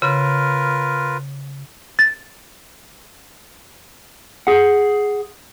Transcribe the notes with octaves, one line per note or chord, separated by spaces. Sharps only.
C#3 F4 A#4 B4
A6
G#4 F#5